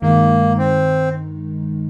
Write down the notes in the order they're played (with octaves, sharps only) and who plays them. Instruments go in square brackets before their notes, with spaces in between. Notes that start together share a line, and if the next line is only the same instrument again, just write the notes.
[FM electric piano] G2 D#3 G#3 D#4 [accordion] A#3
[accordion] C4